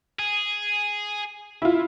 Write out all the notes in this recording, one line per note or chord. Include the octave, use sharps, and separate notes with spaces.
G#4
E4 F4